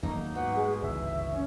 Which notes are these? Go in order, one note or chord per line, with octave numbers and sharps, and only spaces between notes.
D#2 F#3 A3 A#3 D#4
G#2 B2 F#5
G#3
G1 C#2 E3 E5
C#4